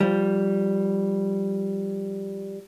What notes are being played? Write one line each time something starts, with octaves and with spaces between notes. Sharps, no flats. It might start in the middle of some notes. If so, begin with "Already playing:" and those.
F3 G3